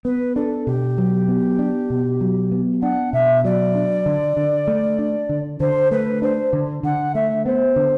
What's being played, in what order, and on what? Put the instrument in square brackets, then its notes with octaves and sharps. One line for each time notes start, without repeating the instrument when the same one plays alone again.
[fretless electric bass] B3 [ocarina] B4
[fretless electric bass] D4 [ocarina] A4
[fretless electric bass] B2 [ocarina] G4
[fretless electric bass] F#3
B3
D4
B2
F#3
B3
[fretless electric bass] D4 [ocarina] F#5
[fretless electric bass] B2 [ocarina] E5
[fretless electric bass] F#3 [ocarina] D5
[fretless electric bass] D4
D3
D3
A3
D4
D3
[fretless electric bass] D3 [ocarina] C5
[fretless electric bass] A3 [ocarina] B4
[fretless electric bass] D4 [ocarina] C5
[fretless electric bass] D3
[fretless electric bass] D3 [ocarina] F#5
[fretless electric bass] A3 [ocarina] E5
[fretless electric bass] B3 [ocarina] C5
[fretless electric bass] D3